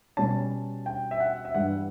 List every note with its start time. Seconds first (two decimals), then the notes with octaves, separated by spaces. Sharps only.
0.17 B2 G3 C#4 A5
0.86 G5
1.11 E5
1.20 F#5
1.45 E5
1.54 G2 E3 G3 F#5